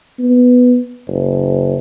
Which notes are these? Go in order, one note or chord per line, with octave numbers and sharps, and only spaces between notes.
B3
F#1